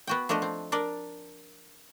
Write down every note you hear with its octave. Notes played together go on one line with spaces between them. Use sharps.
B3 F#4 G5
F3 A3 D4 A4 D#5
C4
D4 A#4 D5